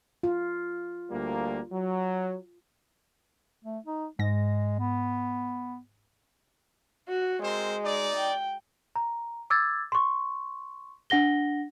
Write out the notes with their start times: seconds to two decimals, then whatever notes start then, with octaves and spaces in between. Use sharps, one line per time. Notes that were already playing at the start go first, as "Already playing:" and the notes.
0.23 F4
1.11 D2 G3 A#3
1.72 F#3
3.65 A3
3.86 D#4
4.19 G#2 G#3 A#6
4.79 B3
7.09 F#4
7.42 G#3 C4 A#4 C5
7.84 D#4 D5
8.16 G5
8.96 A#5
9.50 D6 E6 G#6 A6
9.92 C6 C#6
11.10 D4 F#5 A#6 G7